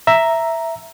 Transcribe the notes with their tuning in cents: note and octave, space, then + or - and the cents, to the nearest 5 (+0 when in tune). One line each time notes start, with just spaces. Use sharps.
E5 +5 A#5 +0